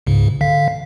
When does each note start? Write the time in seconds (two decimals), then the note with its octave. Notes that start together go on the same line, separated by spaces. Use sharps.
0.07 C#2 G#2 C#3
0.41 D3 F5 B6